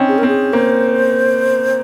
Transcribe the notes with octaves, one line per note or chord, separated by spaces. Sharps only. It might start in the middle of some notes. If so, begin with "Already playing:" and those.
Already playing: C4 C#4 D#4
G#4
A#4
C4 G#4
A#3 C5